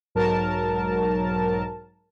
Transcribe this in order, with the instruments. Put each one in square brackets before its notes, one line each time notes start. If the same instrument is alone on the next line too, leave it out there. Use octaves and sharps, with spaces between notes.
[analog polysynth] B1 G#2 F#3 A#4 A5